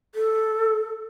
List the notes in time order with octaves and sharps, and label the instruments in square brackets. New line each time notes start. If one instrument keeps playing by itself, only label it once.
[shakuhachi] A4